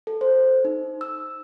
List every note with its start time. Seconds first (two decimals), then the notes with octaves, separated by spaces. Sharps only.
0.07 A4
0.21 C5
0.65 D#4
1.01 E6